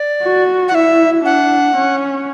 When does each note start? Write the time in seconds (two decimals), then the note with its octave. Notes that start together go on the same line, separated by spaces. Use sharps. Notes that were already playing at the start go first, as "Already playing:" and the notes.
Already playing: D5
0.24 F#4
0.68 F#5
0.74 E4 E5
1.25 D4 F#5
1.76 C#4